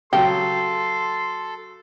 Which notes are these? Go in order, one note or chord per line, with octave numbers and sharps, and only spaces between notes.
C#3 F#3 G4 A4 C6